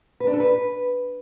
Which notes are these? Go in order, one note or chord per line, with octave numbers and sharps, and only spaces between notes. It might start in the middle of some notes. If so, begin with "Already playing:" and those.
B4
D4
A4
B4